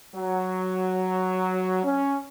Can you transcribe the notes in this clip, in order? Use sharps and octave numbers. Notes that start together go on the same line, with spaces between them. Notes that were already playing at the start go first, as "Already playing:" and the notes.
F#3
C#4